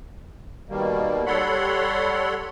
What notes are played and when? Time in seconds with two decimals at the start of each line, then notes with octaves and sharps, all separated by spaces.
0.69 B2 D#3 G3 A#3
1.26 G3 A4 C#5 F#5 B5 C6